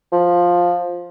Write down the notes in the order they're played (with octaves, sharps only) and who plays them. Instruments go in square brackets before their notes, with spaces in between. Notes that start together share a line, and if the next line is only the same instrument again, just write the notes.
[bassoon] F3